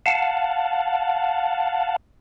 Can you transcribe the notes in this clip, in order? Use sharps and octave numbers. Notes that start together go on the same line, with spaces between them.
F5 F#5 A5